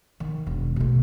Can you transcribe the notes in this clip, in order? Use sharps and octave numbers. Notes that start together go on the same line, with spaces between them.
D#3
E1
B2 A3